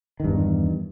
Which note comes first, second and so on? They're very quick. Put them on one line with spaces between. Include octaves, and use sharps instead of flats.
D#3 G2 E2